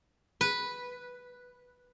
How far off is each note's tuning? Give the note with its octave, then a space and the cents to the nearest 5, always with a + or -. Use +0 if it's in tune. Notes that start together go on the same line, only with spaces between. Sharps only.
B4 -5